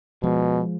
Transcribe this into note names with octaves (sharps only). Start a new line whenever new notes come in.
B2 F3 G#3